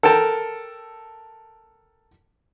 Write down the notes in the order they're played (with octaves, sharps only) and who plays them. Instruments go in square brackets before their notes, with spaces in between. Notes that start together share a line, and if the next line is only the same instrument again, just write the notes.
[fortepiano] A4 A#4 G5 A5